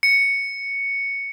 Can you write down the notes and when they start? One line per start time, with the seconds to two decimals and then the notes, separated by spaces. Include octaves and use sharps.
0.03 C#7